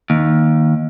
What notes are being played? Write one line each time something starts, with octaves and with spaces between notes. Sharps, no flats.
D#2